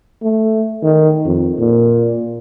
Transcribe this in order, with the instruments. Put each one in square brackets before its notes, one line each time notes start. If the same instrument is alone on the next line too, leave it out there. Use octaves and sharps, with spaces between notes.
[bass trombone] A3
D#3
F2
A#2